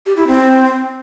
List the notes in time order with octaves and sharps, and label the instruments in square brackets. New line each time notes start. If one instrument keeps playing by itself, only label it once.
[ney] G4
E4
C4